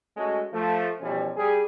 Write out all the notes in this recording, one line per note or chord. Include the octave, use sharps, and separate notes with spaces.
G#3 A3 C#4 F#4 A4
F3 A3
B2 E3 F3 G3 C#4
G3 G4 G#4